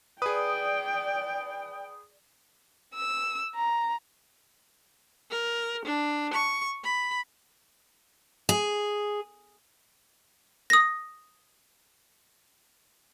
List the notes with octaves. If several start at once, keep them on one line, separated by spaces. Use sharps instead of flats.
G#4 B4 D5 G5 D#6
E6
A#5
A#4
D4
C#6
B5
G#4
D#6 A#6